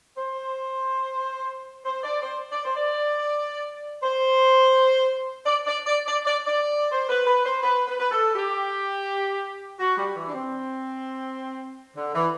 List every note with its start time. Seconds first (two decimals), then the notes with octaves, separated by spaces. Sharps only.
0.17 C5
1.85 C5
2.03 D5
2.22 C5
2.51 D5
2.65 C5
2.76 D5
4.02 C5
5.46 D5
5.67 D5
5.86 D5
6.06 D5
6.26 D5
6.46 D5
6.91 C5
7.09 B4
7.26 B4
7.45 C5
7.63 B4
7.88 B4
8.00 B4
8.11 A4
8.35 G4
9.79 F#4
9.97 G3
10.16 E3
10.27 D4
10.34 C4
11.96 D3
12.15 E3